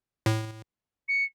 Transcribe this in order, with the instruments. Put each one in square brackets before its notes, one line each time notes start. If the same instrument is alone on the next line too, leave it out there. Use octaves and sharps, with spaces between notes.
[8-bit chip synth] A2
[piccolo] C#7